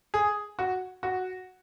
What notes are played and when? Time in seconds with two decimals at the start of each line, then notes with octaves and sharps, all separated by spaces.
0.14 G#4
0.59 F#4
1.03 F#4